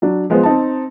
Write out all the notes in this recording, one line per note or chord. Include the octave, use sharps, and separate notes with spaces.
F#3 D4
F3 G#3 B3 C5
C4 D#4 A5